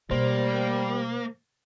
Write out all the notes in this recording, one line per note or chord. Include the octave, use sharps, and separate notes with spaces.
B2 G3 A3 A#3 C5